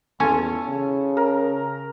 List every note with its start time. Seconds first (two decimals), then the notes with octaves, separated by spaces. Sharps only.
0.20 E2 C#4 F4 A4
0.69 C#3
1.17 A#4